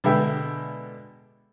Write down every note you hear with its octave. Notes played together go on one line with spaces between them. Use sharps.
B2 D3 G#3 B3 E5 G5